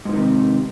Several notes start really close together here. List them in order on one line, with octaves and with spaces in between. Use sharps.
G#2 E3 D#3 C3